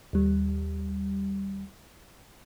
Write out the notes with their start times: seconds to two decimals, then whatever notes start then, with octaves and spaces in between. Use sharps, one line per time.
0.13 D#2 G3